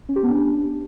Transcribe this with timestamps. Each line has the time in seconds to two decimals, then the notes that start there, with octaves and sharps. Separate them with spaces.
0.09 C#4
0.16 G4
0.23 B3
0.30 D4